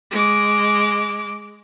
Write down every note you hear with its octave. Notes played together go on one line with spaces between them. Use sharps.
G#3 D6